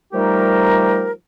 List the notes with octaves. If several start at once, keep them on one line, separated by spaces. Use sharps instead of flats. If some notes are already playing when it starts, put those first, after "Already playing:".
F3 G3 A3 D#4 G4 A#4